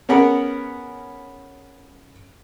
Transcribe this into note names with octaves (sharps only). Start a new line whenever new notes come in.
B3 C#4 G#4 A#4 F#5 B5